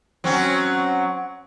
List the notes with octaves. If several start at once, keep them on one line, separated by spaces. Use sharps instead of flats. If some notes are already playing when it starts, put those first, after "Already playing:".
F#3 C4 C#4